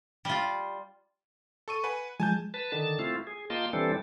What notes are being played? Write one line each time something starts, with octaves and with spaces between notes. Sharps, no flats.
G3 F4
A4 C#6 D#7
B4 F#5 G#5
F3 G#3 G#5 A5 G6
B4 A5
D3 D#3 A5
A3 C4 E4 F4
G#4
A#3 F4 D#5 G5 A5 C6
E3 G3 C4 D4 A4